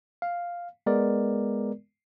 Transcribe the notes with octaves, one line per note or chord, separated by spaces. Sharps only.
F5
G#3 B3 A#4 D5